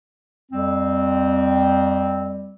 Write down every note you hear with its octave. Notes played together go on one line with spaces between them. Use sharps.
F2 G3 C4